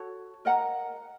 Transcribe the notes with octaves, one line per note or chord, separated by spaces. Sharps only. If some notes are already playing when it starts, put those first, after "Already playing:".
Already playing: F#4 A4 C#5
A#4 D#5 F#5 A#5